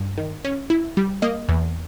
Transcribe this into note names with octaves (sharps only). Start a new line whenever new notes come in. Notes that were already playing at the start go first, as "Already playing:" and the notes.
Already playing: G2
D#3
C#4
E4
G3
A#3 D#5
E2